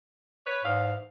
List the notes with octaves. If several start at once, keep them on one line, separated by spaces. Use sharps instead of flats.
B4 C#5
E2 G#2 F5